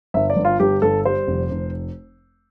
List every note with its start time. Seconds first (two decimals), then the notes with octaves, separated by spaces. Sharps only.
0.14 G1 E5
0.30 D5
0.36 G1
0.45 F4
0.60 G1 G4
0.82 G1 A4
1.05 G3 C5
1.27 F1
1.51 F1